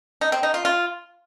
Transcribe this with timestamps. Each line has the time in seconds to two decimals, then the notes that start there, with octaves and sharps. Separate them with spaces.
0.21 D#4
0.32 C4
0.43 D#4
0.54 F4
0.65 F4